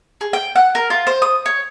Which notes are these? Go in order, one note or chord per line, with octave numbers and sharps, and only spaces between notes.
G#4
G5
F#5
A#4
F4
C5
D#6
C#5